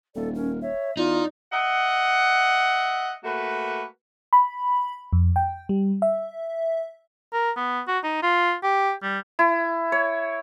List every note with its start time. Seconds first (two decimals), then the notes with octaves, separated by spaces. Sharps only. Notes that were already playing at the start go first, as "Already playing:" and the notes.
0.15 D#1 A4 D5
0.35 C#4 A#4
0.62 C#5 E5
0.97 E2 D#4 F4 D5
1.52 D#5 E5 F#5
3.24 A3 A#3 F#4 B4
4.33 B5
5.13 F2
5.36 G5
5.69 G3
6.02 E5
7.33 A#4
7.57 B3
7.88 F#4
8.04 D#4
8.23 F4
8.63 G4
9.03 G3
9.39 E4
9.92 C#5